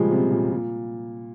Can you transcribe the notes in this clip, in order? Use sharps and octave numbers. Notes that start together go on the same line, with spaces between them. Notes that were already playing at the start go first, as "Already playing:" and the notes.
Already playing: A#2 C#3 F3 G3 G#3
C3
A#2
A#2